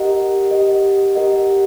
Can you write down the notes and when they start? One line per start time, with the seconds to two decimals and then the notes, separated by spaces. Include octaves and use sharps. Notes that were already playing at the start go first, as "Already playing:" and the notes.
Already playing: G4 A#4 D#5 F#5
0.51 G4 A#4 D#5 F#5
1.15 G4 A#4 D#5 F#5